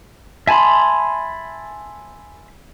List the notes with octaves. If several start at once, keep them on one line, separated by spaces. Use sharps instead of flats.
E5 G#5 A5 B5 C6